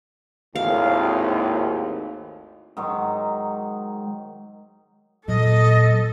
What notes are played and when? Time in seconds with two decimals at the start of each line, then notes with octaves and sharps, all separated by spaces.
0.55 G#1 D#2 A2 F5
2.77 G#2 D#3 F#3
5.28 A#2 F#3 A4 D#5